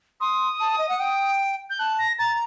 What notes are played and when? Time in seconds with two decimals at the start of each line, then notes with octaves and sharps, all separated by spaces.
0.20 C6 D#6
0.60 A5
0.78 D#5
0.89 F#5
1.00 G5
1.70 G6
1.79 A5 F#6
1.99 A#6
2.19 A#5 A6